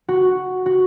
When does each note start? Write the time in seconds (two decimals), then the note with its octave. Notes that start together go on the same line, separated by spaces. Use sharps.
0.08 F#4
0.66 F#4